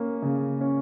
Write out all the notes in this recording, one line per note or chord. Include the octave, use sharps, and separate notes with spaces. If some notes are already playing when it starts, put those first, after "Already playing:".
Already playing: A#3 C#4
C#3
C#4